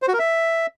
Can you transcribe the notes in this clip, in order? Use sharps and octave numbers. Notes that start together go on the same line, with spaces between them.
C5
F#4
A#4
E5